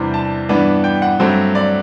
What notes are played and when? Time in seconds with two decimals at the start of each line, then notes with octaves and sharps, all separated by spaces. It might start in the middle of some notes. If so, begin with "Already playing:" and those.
Already playing: E2 C3 E3 G3 D4 C5
0.14 A5
0.49 G2 E3 B3 D4
0.84 G5
1.02 F#5
1.20 G2 F#3 A3 C4
1.55 D5